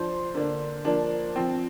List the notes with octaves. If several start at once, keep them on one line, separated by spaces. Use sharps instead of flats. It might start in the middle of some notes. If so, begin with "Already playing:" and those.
Already playing: F3 D4 C5 C6
D3 A#3 D4
F3 A#3 D4
F3 C4